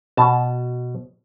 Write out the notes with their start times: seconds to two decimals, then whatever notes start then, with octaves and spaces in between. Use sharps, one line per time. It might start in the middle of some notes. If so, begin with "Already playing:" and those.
0.17 B2 A5